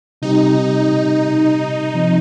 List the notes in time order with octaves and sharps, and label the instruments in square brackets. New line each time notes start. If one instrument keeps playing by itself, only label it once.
[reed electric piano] C3 G3 C4 G4 [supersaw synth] D#4
[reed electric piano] C3 F3 C4